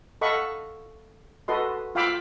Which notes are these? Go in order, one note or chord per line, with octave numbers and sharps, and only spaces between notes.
A4 D#5 F5 F#5 B5 C#6
F#4 A4 B4 D#5 C6
F4 F5 G5 B5 D6 E6